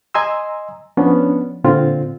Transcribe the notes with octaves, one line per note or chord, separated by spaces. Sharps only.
D#5 G#5 A#5 C6 E6
F3 B3 C#4 D4
A#2 D3 C4 F4